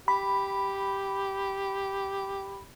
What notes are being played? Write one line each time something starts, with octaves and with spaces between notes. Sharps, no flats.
G4 B5